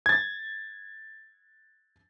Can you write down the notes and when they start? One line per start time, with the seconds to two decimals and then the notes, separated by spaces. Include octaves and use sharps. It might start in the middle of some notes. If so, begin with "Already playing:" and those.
0.06 G#6 A6